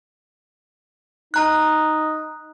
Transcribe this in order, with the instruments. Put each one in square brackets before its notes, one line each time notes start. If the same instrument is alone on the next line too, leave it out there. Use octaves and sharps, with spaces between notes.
[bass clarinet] D#4 [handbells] A#5 F#6